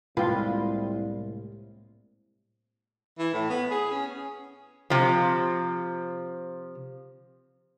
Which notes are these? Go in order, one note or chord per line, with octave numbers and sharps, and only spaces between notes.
C2 A2 G#3 A#3 F4 B4 G5
E3
A2
B3
G#4
C#4
C3 F3